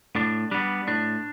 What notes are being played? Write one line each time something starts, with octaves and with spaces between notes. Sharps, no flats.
A2 D4
G3 B3 D4
A2 D4